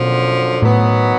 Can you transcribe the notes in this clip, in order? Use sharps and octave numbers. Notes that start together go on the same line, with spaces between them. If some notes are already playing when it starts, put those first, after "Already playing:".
Already playing: F#2 B2 D3 F3
A2 D#3 F#3 B3